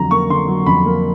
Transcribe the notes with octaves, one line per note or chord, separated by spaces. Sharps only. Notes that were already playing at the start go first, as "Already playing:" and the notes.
Already playing: F2 D3 F#3 A#5
A#3 C#6
D3 C6
F#3
F2 B5
A#3